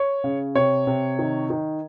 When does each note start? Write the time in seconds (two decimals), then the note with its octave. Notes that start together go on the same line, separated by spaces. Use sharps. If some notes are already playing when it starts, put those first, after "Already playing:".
Already playing: C#5
0.24 C#3
0.55 C3 C#5
0.87 C3
1.19 D#3
1.50 D#3